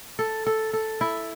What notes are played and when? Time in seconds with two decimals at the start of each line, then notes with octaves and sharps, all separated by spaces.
0.19 A4
0.47 A4
0.73 A4
1.01 E4